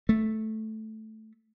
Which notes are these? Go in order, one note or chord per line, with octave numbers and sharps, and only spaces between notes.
A3